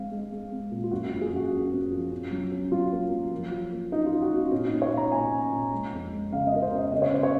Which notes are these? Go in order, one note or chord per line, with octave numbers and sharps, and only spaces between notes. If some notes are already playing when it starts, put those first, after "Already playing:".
Already playing: G#3 C4 F5
G#3
G#3
C4
A#2
F4
F#2 F#4
F#4
F#2
G#4
F#2 F#4
F#2
C4
F3
C#4
F#3
C#4
F#3 F4
A#3
F#3
F3
F3
A#3
C#4 D#4
F4
A#3
F#4
C#4
F4
A#2 C#4
D#4
A#2
C#5
A#2
A#5
A#2 G#5
C#4
A#2
G#3
F2
G#3
C#3 F5
D#5
C#4 A#4
C5
C#4
D#5
C#3 D#5
C#5
C#3 C5
C#5